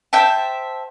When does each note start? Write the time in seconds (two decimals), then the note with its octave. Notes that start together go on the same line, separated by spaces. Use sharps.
0.13 C5 E5 G5 A5